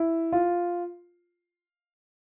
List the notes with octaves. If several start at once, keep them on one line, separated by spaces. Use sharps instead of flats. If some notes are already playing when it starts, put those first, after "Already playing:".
Already playing: E4
F4